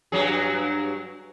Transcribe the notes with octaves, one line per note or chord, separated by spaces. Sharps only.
G2 F#3 G#4